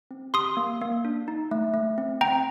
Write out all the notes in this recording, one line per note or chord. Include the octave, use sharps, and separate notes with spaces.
C4
G4 C6 D#6
A#3
A#3
D4
D#4
A3
A3
C4
C4 G5 A#5